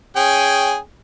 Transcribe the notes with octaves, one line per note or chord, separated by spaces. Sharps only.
C#4 G#4 G5